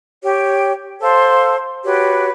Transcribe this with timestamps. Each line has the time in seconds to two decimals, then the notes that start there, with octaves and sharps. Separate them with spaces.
0.24 G4 C#5 G5
1.01 A4 C5 F5 A5
1.84 F#4 G4 B4 C#5